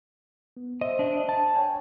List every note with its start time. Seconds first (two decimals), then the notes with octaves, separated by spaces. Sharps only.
0.57 B3
0.81 C5 D#5 E5
0.99 D4 D#5
1.29 A5
1.56 C#5 G5 G#5